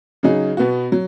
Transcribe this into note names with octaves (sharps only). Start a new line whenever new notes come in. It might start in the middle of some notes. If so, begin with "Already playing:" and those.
C#3 F#3 D#4 G#4
B2 B3 F#4
F#3